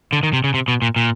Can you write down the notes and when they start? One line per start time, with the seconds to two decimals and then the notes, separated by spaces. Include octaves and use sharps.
0.13 D3
0.23 D#3
0.33 C3
0.44 C#3
0.54 C3
0.68 B2
0.82 A#2
0.96 A#2